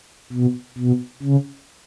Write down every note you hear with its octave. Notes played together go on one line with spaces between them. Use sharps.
B2
B2
C#3